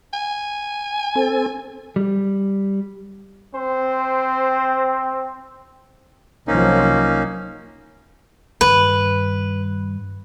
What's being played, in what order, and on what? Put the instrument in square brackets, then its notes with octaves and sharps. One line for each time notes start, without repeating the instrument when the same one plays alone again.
[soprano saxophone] G#5
[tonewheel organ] C4 A4
[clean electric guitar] G3
[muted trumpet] C4 [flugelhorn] C5
[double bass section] C2 F3 F#3 [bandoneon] A#3 C#4 D#4
[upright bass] G2 D#3 [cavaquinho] B4